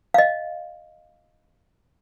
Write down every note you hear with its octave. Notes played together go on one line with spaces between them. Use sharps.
D#5 F5